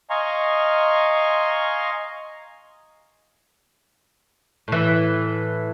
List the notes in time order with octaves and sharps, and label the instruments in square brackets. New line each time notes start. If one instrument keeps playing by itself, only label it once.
[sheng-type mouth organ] D#5 F5 G#5 A#5 C6 C#6
[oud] A2 E3